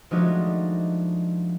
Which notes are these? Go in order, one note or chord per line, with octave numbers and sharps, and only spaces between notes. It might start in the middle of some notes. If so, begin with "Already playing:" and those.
F3 G#3 A3 D4 D#4 F#4